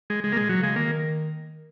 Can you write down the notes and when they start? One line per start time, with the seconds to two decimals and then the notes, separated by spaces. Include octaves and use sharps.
0.10 G#3
0.23 C#3 G#3
0.32 A#3
0.36 A#2 G#3
0.49 F#3
0.59 C#3 G#3
0.76 D#3 A#3